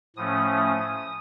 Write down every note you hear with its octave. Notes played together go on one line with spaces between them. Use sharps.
A2 F3 A3 C#4 D#6